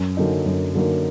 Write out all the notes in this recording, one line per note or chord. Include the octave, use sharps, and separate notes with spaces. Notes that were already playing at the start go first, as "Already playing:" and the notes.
Already playing: F#2
D3 F#3 A#3 D#4
F#2
D3 F#3 A#3 D#4